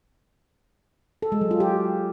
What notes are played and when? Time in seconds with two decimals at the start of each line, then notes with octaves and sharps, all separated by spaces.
1.22 A4
1.32 G#3
1.41 F#3
1.51 F4
1.60 G4